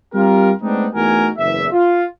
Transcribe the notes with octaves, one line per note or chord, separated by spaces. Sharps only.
G3 C4 F4 G4 A#4
G#3 A3 B3 C4 D4 D#4
E2 A3 D#4 F#4 A#4 G#5
F#1 E2 E5
F4